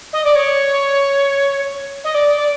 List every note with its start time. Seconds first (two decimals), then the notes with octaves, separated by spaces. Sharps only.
0.13 D#5
0.25 D5
0.35 C#5
2.04 D#5
2.14 D5
2.37 D5